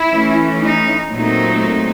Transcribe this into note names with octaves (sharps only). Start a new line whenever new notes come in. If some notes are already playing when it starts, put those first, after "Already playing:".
Already playing: E4
E3 A3 C#4
D#4
A#2 F#3 A3 C4 D#4